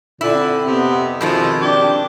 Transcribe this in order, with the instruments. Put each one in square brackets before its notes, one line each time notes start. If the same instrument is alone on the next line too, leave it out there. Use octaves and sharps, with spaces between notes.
[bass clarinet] A#2 [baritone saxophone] D3 [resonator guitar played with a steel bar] E4
[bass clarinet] C4
[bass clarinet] F2 [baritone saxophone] C3 [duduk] B3
[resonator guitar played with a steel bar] B2 D#3 G#3 [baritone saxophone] F3 [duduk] E4
[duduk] D4 [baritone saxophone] G4